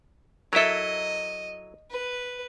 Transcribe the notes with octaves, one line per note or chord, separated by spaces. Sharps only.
F#3 E4 A4 A#4 D#5 E5
B4